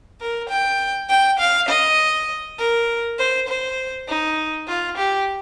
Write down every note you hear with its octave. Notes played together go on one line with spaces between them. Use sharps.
A#4
G5
G5
F5
D#5
A#4
C5
C5
D#4
F4
G4